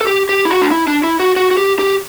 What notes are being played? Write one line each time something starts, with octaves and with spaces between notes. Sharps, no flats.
A4
G4
G4
E4
F#4
D4
E4
D4
E4
F#4
F#4
F#4
G4
G4